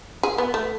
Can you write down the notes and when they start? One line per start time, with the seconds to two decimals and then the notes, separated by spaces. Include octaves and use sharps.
0.23 G#4
0.38 B3
0.54 A3